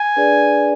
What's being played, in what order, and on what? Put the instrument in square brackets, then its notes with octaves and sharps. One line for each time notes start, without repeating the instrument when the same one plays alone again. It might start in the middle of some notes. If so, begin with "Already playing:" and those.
Already playing: [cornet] G#5
[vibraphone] D4 G#4 B4 D5